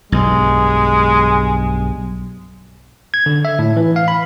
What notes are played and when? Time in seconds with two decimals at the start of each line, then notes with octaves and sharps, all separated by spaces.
0.12 B1 G2 G#3
3.14 G#6
3.26 D3
3.45 E5
3.59 A2
3.77 E3
3.96 F5
4.08 B5